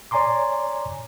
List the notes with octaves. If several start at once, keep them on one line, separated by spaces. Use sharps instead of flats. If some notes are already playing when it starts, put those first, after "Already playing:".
C#5 D5 G#5 A#5 C6 D6